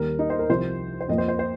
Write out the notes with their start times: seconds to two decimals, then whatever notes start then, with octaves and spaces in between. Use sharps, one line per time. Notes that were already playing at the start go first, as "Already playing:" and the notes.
Already playing: D#2 D#3 G3 A#4
0.19 D#4
0.30 C5
0.39 A#4
0.49 C2 C3 F3 C5
1.01 C5
1.08 F2 F3 A#3 D#5
1.18 C5
1.28 C5
1.39 C5